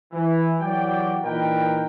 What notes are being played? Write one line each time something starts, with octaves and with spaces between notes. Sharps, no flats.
E3
E3 F#3 F#4 G4 D5 G5
A#2 E3 D#4 A#4 B4 G5